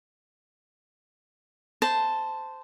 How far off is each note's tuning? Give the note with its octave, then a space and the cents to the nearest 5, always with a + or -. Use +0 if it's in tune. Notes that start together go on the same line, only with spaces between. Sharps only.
C5 -10 A5 +0